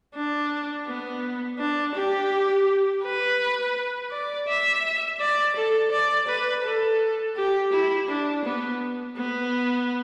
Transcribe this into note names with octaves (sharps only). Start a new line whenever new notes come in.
D4
B3
D4
G4
B4
D5
E5
D5
A4
D5
B4
A4
G4
E4
D4
B3
B3